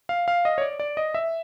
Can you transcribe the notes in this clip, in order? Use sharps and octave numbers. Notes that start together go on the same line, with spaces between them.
F5
F5
D#5
C#5
D5
D5
D#5
E5